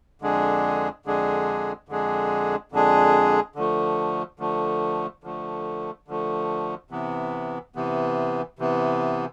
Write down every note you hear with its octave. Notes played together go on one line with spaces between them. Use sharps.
F2 D3 G#3 D4 G#4
F2 D3 G#3 D4 G#4
F2 D3 G#3 D4 G#4
F2 D3 G#3 D4 G#4
D3 F3 A3
D3 F3 A3
D3 F3 A3
D3 F3 A3
C3 E3 B3
C3 E3 B3
C3 E3 B3